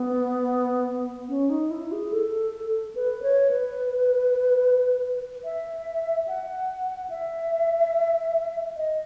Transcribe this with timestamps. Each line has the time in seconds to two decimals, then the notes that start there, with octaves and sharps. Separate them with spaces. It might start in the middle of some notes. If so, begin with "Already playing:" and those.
Already playing: B3
1.29 C#4
1.50 D#4
1.71 E4
1.92 G#4
2.12 A4
2.95 B4
3.23 C#5
3.51 B4
5.45 E5
6.28 F#5
7.10 E5
8.76 D#5